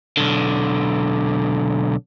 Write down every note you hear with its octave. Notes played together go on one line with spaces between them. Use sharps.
B1 D3